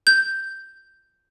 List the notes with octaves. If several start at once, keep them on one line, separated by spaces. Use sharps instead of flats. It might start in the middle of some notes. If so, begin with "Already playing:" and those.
G6